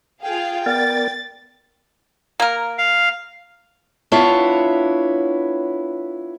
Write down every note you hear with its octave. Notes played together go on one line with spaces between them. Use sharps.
F4 G#4 F5 G5
B3 A#4 D5 A6
A#3 A#4
F5
B3 D4 E4 F4 C#5